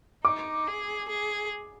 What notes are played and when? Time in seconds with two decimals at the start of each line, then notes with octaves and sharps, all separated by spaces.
0.24 D#4 D6
0.67 G#4
1.09 G#4